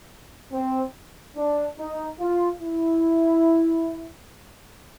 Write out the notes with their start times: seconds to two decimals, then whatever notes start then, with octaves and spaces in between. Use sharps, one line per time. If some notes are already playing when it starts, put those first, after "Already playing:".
0.53 C4
1.36 D4
1.78 D#4
2.20 F4
2.62 E4